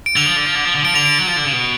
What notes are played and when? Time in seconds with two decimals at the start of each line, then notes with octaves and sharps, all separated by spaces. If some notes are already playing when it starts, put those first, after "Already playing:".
0.06 D7
0.16 D3 F7
0.26 F3
0.36 D3
0.46 F3
0.55 D3
0.65 F3
0.75 D3
0.84 F3 D7
0.94 D3 F7
1.05 D7
1.20 F#3
1.27 F3
1.36 D3
1.45 C#3
1.53 B2